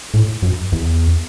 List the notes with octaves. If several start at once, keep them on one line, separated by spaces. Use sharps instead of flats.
A2
F#2
E2